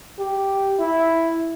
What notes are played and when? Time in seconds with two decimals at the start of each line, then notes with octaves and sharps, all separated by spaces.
0.19 G4
0.79 E4